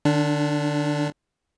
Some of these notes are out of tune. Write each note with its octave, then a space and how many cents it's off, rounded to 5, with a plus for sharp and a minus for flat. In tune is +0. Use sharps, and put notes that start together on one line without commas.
D3 +35 D4 -15